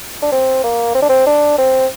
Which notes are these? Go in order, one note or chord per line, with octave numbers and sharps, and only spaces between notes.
D4
C4
A#3
C4
D4
C4
D4
C4